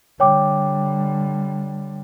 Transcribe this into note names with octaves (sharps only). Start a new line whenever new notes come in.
D3 G3 C#5 G5 D6